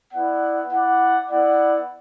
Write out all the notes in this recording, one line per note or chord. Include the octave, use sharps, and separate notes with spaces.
B3 E4 D5 F#5
E4 D5 F#5
B3 E4 D5 F#5